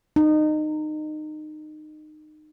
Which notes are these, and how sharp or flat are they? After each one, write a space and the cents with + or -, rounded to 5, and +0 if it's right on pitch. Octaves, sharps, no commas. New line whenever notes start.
D#4 -25